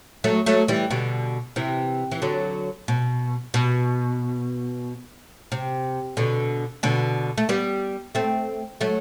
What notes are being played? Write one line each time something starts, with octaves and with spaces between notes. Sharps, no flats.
F#3 A3
F#3 A3
E3 G3
B2 D3
C3 E3
E3
D3 F#3
B2
B2
C3
B2 D3
B2 D3
A3
G3 B3
A3 C4
F#3 A3